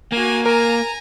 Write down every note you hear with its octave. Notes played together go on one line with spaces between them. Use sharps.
A#3 F#4 G#5
A#4 G#5 A#5